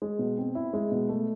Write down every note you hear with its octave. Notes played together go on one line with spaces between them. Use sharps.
G#3
B2
C4
E4
G#3
B2
A3